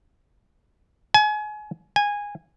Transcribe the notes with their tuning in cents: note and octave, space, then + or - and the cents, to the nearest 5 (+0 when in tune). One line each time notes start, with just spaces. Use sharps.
G#5 +30
G#5 -15